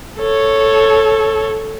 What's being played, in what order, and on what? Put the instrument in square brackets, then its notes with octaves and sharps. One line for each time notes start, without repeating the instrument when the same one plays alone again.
[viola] A4 C#5